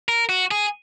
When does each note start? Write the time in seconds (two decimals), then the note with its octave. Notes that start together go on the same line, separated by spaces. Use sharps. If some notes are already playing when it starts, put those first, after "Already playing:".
0.09 A#4
0.29 F#4
0.51 G#4